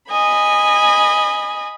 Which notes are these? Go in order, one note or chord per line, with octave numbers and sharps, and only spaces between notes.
D#5 G#5 B5